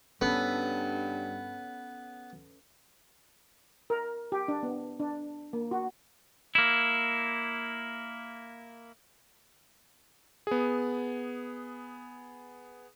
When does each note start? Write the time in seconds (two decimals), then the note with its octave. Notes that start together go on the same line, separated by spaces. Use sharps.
0.21 G2 B3 C#4 A4 B4
3.90 A#4
4.32 G4
4.48 D4
4.63 B3
4.99 D4
5.53 A#3
5.71 F#4
6.55 A#3 E4
10.47 B3 G#4